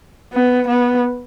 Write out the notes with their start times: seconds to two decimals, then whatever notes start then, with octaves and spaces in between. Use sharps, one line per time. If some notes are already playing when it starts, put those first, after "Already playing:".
0.33 B3
0.68 B3